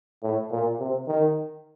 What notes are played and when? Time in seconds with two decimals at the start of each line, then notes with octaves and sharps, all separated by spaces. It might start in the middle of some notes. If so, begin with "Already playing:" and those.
0.23 A2
0.51 A#2
0.79 C3
1.07 D#3